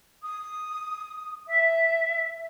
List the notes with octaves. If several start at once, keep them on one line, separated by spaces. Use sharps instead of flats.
D#6
E5